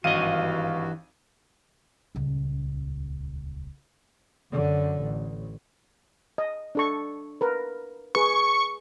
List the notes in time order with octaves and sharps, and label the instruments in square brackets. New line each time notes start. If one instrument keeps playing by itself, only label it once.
[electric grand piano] G#1 F5 D#7 [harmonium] G2 F#4 [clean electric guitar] E3 D#5
[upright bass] D#1 C#2
[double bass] F#2 D3
A1
[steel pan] D#5
D4 A4 C#6
A#4 B4
[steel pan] G#4 B4 [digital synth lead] C#6